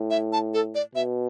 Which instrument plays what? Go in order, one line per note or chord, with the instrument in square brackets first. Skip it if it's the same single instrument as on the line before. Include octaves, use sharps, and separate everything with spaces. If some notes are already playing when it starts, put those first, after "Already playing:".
Already playing: [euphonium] A2
[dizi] E5
A5
A4
D5
[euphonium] B2 [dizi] E5